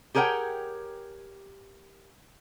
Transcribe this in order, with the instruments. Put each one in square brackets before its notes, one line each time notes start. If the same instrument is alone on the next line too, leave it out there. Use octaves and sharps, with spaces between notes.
[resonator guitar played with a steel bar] G4 G#4 A#4 C#5 F#5 G5